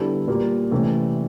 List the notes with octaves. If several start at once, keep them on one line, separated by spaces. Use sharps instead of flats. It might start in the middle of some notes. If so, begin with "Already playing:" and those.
Already playing: D3 G3 B3 E4 A4
A#2 G3 A#3
C3 E3 A3 C#4